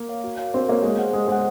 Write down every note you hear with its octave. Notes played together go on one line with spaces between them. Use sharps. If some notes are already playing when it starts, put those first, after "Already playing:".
Already playing: A#3
C#5 F5
F#4
C#5 F5
C4 F#4
A#3 C#5 F5
G#3 G#4
C5 F#5
G#3 G#4
G#3 C5 F#5